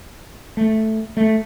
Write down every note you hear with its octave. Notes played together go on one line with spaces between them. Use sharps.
A3
A3